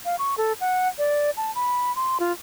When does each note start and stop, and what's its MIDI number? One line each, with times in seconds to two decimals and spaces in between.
0.05 0.16 77
0.19 0.35 85
0.38 0.53 69
0.61 0.88 78
0.98 1.31 74
1.37 1.53 81
1.55 1.94 83
1.96 2.18 84
2.20 2.32 65